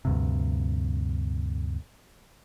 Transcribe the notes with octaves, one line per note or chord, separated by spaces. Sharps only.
D2 G2 C3